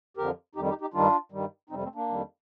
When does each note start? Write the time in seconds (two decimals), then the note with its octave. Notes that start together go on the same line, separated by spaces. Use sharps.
0.17 F2 D3 F3 G4 A#4
0.55 F2 D#3 G3 D#4 G4
0.69 D#4 G4
0.81 D#4 G4
0.94 G2 D#3 G3 D4 F4
1.32 G2 D#3 G3
1.70 F2 C3 G3 C4 D#4
1.83 A3 C4
1.95 A#3 D4
2.08 F2 D#3 G3